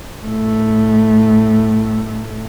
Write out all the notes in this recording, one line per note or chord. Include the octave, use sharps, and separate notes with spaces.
A2 A3